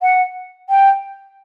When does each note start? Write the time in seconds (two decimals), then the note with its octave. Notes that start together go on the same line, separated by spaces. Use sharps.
0.02 F#5
0.69 G5